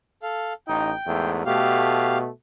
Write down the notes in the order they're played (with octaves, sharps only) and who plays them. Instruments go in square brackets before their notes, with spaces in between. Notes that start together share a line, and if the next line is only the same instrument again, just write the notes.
[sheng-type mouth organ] A4 F5
[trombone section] A1 D#4 [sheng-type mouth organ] G5
[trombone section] E2 G#2 A3
[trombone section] B2 A3 [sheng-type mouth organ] G4 F5